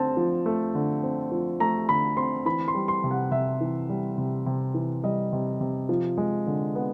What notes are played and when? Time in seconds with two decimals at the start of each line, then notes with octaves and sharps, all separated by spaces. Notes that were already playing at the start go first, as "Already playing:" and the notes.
Already playing: D3 A3 C4 A5
0.17 F3
0.46 A3
0.75 D3
1.03 C4
1.32 F3
1.60 A3 A#5
1.89 D3 B5
2.17 C4 C6
2.46 E3 B5
2.68 C6
2.75 G3
2.88 C6
3.04 C3
3.11 F#5
3.31 C3 E5
3.61 E3
3.89 G3
4.18 C3
4.46 C3
4.74 E3
5.03 G3 D#5
5.33 C3
5.61 C3
5.89 F3
6.18 G#3
6.47 D3
6.75 B3